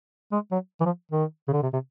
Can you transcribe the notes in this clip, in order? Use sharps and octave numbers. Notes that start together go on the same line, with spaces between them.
G#3
F#3
E3
F3
D#3
C#3
D3
C3
C3